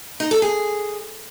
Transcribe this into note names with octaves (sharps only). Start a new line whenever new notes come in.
D#4
A4
G#4